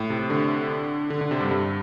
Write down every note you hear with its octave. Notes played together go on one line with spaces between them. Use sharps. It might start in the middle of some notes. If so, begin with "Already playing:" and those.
Already playing: A2
C3
D3
D3
D3
C3
G2
G2